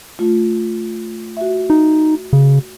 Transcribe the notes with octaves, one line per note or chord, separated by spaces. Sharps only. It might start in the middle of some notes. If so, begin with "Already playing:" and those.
A3 F4
F#4 E5
D#4
C#3